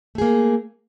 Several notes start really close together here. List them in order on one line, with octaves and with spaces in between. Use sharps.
A3 G#4 A#3